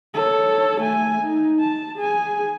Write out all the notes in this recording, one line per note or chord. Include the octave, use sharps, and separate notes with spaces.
A4 C#5
A3 G#5
D#4
A5
G#4 G#5